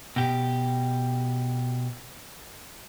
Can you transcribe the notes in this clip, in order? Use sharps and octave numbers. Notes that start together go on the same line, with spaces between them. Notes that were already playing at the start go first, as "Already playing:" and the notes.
B2 G4